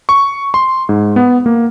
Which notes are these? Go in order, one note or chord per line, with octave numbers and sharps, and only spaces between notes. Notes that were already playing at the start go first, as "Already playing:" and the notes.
C#6
C6
G#2
B3
A#3